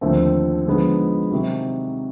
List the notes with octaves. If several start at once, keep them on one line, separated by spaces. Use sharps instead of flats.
D#2 D3 F3 A3 C4
D3 F3 G#3 B3 D#4
C3 D#3 F#3